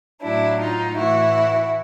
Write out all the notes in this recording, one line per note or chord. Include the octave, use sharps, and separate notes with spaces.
A2 F#3 D4 E4
D#4 F4
A2 E3 E4 F#4